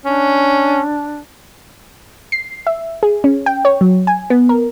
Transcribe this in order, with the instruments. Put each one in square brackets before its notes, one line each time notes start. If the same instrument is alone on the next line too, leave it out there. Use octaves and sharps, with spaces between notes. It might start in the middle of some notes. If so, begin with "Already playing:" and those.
[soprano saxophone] C#4 [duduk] D4
[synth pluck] C7
E5
G#4
C#4
G5
C#5
F#3
G#5
B3
A#4